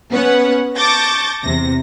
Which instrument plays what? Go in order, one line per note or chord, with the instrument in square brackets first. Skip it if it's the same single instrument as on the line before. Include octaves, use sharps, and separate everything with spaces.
[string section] B3 C#4 B4 F#5
A5 C#6 D6 G6 A6 A#6
E2 C3 A#6